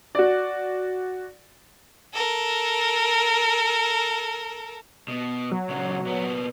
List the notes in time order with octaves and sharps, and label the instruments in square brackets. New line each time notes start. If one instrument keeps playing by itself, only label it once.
[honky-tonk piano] F#4 D5
[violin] A4 A#4
[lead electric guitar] B2
[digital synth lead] F#3
[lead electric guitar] A#2 C#3
A#2 B3